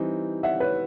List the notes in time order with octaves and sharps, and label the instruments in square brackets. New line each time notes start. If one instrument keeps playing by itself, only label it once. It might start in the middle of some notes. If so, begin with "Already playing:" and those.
Already playing: [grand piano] E3 G3 C4 D#4
[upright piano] E5 F#5
B4 C#5